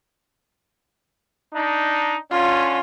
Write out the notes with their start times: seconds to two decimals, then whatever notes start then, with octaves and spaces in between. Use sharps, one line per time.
1.53 D4 D#4
2.30 D3 C#4 F4